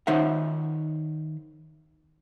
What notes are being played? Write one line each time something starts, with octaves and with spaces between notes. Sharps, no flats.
D#3 D#4 C5 C#5 E5 F#5